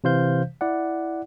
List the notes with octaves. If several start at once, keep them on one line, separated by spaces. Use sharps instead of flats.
C3 E3 C5 F5 G6
E4 D5 F#5